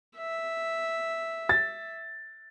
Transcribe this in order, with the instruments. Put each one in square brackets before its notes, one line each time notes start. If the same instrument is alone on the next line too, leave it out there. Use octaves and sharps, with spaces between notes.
[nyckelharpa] E5
[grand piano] A6